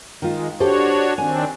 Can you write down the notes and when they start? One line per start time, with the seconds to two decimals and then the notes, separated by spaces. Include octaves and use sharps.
0.22 D#3 G#3 F4
0.60 D4 F#4 G4 A4 C5 C#5
1.18 D#3 C4 D4 G#5